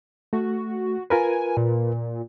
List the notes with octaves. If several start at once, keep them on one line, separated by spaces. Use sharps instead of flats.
A3 F#4
F4 A#4 B4 G#5
A#2